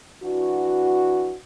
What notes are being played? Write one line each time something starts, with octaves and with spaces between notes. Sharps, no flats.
E3 D4 F#4